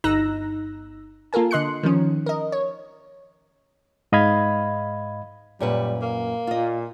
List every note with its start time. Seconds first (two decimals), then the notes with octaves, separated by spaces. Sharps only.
0.04 G1 D#4 A#5 E6 F#6 A#6
1.33 A#3 F4 A4 A#4 G#5
1.51 D3 D#5 C6 F#6 C#7
1.83 D#3 F3 C#4
2.26 A#4 D#5
2.52 C#5
4.12 G#2 D#5 F5 B5 G#6
5.60 F#2 A#2 G3 B4
6.02 A#3
6.47 A#2 F4 D#5